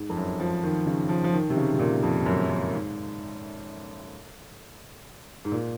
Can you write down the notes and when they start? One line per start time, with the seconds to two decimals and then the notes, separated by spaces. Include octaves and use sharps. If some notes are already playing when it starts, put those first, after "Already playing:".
Already playing: G#2
0.09 F2
0.17 F#2
0.40 F3
0.63 D#3
0.86 C#3
1.09 F3
1.24 F3
1.33 D#3
1.50 C3
1.57 C#3
1.74 C3
1.79 A#2
2.03 F2
2.17 G#2
2.26 F#2
2.50 F#2
2.73 G#2
5.45 G#2
5.52 A#2